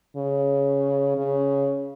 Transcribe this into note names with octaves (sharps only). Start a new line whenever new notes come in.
C#3
C#3